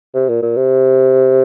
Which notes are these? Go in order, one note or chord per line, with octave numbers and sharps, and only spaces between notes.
C3
A#2
A#2
C3